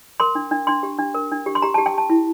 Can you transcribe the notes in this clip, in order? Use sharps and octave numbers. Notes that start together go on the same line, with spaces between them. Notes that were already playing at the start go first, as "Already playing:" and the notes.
A#4 C6
D4
D4
D4 C6
G4
D4
A#4
D4
G4
C6
G4 A#5
A5
G4
G5
G4 A5
E4